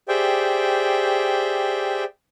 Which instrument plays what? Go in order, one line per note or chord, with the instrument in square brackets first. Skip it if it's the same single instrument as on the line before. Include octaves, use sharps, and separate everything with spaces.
[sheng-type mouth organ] G4 G#4 C5 D5 E5 G5